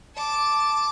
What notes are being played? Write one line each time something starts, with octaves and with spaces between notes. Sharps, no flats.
A5 D6